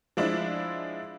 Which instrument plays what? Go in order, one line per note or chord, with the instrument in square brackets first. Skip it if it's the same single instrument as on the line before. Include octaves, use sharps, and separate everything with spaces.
[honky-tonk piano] F3 G#3 D4 E4